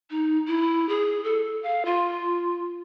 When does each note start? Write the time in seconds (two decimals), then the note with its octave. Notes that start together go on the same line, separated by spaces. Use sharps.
0.11 D#4
0.48 E4
0.89 G#4
1.24 A4
1.63 F5
1.85 F4